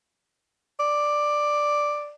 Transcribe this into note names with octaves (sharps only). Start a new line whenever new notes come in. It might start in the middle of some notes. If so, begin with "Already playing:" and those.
D5